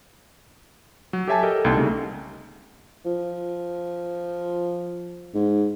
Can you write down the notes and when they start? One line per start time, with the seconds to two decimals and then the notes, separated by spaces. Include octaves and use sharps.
1.13 F#3
1.28 G4 A4 C#5 E5 G#5 A5
1.43 G4 A4 A#4 D#5
1.65 C2 A#3 D#4 G5 A5
1.77 C#3 G3 A3 D#4
3.06 F3
5.35 G#2